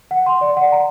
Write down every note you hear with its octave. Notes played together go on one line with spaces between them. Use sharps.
F#5
C6
D5
F#5
A#5